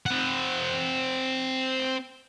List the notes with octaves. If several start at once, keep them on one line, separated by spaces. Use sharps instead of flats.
C4 F#5